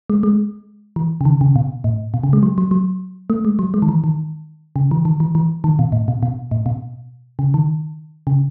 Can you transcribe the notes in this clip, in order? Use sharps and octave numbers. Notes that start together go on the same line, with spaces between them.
G#3
G#3
E3
C#3
D#3
C#3
B2
A2
B2
C#3
G#3
F#3
F#3
F#3
A3
G#3
F#3
G#3
D#3
E3
D#3
C#3
E3
D#3
E3
E3
D#3
B2
A2
B2
B2
A2
B2
C#3
D#3
C#3